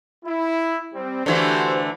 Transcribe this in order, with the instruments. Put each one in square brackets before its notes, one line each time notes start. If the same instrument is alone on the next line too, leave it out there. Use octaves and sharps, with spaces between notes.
[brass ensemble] E4
G3 C4
[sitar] D3 E3 A3 [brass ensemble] F#4 G4 C5